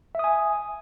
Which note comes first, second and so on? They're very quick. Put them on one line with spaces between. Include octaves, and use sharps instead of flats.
E5 D#6 G#5